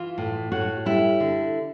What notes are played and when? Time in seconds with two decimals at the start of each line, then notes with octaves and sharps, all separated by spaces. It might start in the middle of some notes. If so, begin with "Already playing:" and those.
Already playing: E3 F4
0.18 A2
0.52 A2 F#4
0.86 G3 E4
1.20 D3